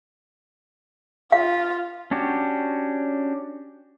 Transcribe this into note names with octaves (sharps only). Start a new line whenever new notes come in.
F4 F5
C#4 D4 F#4 G4